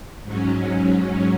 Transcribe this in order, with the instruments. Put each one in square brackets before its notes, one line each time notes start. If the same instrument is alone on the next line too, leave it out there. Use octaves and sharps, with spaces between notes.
[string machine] G#2 F#3 C#4